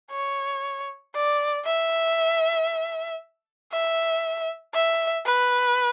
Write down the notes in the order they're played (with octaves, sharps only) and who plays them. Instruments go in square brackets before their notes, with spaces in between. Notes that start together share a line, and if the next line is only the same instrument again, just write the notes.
[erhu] C#5
D5
E5
E5
E5
B4